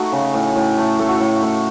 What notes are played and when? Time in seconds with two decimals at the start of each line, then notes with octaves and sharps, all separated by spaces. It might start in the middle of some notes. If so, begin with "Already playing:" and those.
Already playing: A3 D#4 F#4
0.12 C#3
0.34 A2
0.56 A2
0.78 A3
0.99 A3 A4
1.09 F#4
1.17 A2 A4
1.43 A2